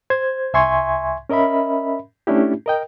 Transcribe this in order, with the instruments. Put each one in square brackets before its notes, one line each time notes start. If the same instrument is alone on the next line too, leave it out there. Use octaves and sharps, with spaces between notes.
[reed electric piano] C5 G#6
C2 E5 G#5 C6 C#6 G#6
C#4 A#4 D#5 E5 B5
A3 C#4 D4 E4 G4
A#4 D#5 G5